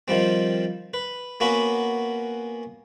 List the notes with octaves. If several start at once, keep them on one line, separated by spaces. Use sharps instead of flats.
D#3 F3 G3 C4
B4
A#3 B3 C#4 F#4 B4